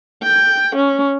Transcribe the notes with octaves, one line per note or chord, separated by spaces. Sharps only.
G5
C#4